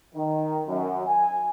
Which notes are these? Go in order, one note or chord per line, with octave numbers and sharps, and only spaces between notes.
D#3
F#2
G#5